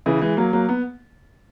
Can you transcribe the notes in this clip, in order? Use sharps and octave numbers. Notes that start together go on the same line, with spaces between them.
C#3 E3
E3 G#3
F#3 A#3
F#3 A#3
B3